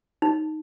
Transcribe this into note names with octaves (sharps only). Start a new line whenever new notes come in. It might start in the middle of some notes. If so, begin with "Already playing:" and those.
D#4